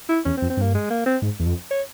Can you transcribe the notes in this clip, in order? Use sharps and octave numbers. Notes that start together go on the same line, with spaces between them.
E4
E2 C#4
C4
F2
C4
G2 A#3
G#3
A#3
C4
G#2
E2
F2
C#5